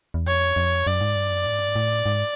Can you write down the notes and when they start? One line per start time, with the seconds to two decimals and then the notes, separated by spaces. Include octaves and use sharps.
0.14 E2
0.26 F2 C#5
0.56 F2
0.87 F#2 D5
1.01 G#2
1.16 G2
1.30 F#2
1.46 A2
1.53 G#2
1.60 G2
1.68 G#2
1.76 A2
2.06 G#2